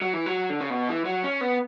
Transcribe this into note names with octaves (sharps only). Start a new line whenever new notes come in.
F#3
E3
F#3
D3
C#3
B2
E3
F#3
C#4
B3